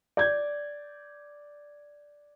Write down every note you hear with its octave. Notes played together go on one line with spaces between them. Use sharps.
D5 G6 G#6